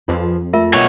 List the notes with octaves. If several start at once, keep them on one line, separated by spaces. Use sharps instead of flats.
F2 F3 G#4 B4
A3 F4 A#4 E5
B2 C#5